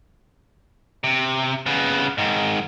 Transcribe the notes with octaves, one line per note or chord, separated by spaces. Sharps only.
C3
C#3 B3
G#2 D#3